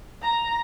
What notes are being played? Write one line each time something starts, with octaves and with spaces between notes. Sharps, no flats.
A#5